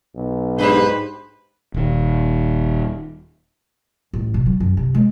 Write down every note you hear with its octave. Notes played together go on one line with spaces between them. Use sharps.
B1
G#2 D4 G4 B4 C5
D#1 D#3
A1
C3
F#3
F#2
C3
G#3